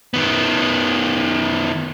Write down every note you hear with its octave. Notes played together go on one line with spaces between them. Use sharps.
D#3 B3